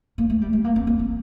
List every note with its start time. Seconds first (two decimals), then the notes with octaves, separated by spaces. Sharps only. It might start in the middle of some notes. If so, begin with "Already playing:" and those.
0.18 A#3
0.30 A3
0.41 G3
0.53 A3
0.64 A#3
0.76 C4
0.87 A#3
0.99 C4